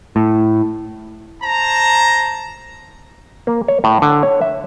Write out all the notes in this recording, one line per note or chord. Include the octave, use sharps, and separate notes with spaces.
A2
C5 A5 A#5
A#3
C#5
A2
D3
C#5
E5